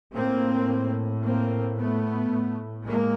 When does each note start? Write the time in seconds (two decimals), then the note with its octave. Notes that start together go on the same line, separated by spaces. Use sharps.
0.14 A2 A#3 C4
1.22 A#3 C4
1.77 A3 B3
2.31 A2
2.86 G#3 A#3